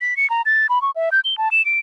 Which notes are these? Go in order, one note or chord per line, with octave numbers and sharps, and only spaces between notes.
B6
C#7
A#5
A6
B5
C#6
E5
G6
G7
A5
E7
D7